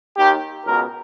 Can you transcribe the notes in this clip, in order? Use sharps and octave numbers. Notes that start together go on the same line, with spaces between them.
D#2 D#3 G4
C#2 B2 A#4